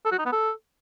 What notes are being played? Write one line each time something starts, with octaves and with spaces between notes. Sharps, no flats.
A4
F#4
D#4
B3
A4